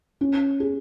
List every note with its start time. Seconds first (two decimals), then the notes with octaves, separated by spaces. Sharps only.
0.21 C#4
0.60 G#4